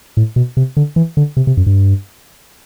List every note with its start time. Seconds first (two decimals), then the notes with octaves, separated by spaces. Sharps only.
0.17 A2
0.36 B2
0.57 C3
0.77 D3
0.96 E3
1.17 D3
1.37 C3
1.47 C3
1.57 F#2
1.66 G2